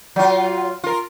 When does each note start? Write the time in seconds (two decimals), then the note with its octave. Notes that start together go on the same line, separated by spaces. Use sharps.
0.16 F#3 F4
0.84 F4 A#4